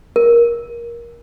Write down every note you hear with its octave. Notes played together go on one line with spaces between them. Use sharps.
A#4